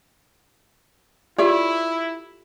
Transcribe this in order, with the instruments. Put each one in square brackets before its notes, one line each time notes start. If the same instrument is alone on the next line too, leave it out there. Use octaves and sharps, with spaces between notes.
[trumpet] E4 [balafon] F4 [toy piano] G4 A4 [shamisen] C#5 D5 E5